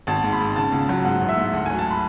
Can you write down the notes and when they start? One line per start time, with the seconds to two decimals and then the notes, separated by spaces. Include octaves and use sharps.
0.07 G#1 A5
0.23 G#2
0.33 B5
0.41 G#2
0.56 C#3 A5
0.72 C#2
0.89 F#3
1.04 G#2 F#5
1.21 A1
1.29 E5
1.37 G#2
1.53 D2 F#5
1.66 G#5
1.70 F#3
1.79 A5
1.91 B5